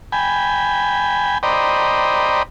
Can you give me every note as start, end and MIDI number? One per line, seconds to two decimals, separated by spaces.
0.12 1.38 79
0.12 1.38 80
0.12 1.38 83
1.43 2.43 72
1.43 2.43 74
1.43 2.43 75
1.43 2.43 79
1.43 2.43 82
1.43 2.43 83